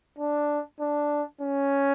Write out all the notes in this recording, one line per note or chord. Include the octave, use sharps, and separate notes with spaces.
D4
D4
C#4